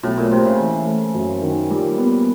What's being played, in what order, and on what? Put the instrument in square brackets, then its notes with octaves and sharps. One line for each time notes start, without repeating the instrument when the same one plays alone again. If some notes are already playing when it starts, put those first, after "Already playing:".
[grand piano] B1 [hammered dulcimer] A2
[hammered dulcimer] A#2
[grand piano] A2 [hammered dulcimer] C3
[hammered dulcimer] C#3
[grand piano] E3
A3
F#2
D#3
[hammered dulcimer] A#2 [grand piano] G3
[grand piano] B3